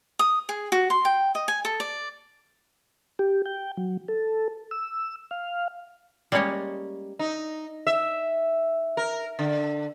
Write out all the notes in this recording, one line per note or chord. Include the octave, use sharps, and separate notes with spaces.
D#6
G#4
F#4
C6
G5
D#5
G#5
A4
D5
G4
G5
F#3
A4
E6
F5
G3 G#3 A#3 C#4 C#5 D#5
D#4
E5
A#4
D3